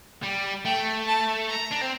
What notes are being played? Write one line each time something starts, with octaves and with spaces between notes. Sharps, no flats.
G3
A3 G5
A5
A#5
D4
C4